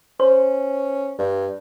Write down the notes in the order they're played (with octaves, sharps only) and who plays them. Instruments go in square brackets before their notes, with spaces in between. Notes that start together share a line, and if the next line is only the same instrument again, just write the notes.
[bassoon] C#4 [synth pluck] C5
[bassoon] G2